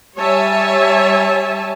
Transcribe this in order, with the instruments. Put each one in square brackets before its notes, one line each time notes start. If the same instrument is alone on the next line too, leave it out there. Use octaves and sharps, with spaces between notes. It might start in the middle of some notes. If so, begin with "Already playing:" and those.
[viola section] G3 C#5 E5 G#5 A5